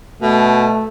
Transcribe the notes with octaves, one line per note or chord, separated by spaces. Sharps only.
B2 A3